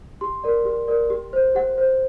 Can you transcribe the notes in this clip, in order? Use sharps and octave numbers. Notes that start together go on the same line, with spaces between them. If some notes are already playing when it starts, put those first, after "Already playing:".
G4 C6
A#4 D5
G4
A#4 D5
G4
C5
G4 F#5
C5